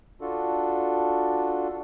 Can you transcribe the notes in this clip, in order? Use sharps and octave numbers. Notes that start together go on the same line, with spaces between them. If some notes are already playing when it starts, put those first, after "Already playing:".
D4 F4 F#4 A4